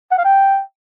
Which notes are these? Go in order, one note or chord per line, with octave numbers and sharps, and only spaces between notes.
F#5
F5
G5